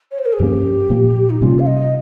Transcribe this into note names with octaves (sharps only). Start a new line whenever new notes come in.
C#5
C5
A#4
G#4
G2 F3 A#3 C#4 G4
A#2 F3 A#3
D#4
C3 G3 A#3 C#4 F4
F5
D#5